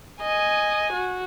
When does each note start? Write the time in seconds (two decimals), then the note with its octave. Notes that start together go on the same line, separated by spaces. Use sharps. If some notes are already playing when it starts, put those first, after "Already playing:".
0.22 D#5 G#5
0.93 F#4